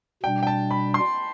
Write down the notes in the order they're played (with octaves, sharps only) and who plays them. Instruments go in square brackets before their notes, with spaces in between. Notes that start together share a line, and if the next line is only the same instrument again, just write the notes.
[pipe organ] B2 G3 D4 [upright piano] G5
[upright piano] G5
A5
B5
C6